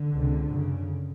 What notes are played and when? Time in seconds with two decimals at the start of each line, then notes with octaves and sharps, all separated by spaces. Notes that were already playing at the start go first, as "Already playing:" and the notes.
Already playing: D3
0.11 C#2 C3
0.49 F#2 C#3